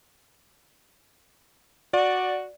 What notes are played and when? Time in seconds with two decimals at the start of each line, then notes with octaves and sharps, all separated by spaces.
1.93 F#4 D5